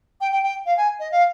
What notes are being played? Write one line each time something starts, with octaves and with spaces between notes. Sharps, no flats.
G5
G5
G5
F5
G#5
D#5
F5